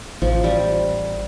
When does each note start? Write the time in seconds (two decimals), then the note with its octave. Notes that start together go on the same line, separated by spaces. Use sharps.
0.22 A1 F3
0.44 G3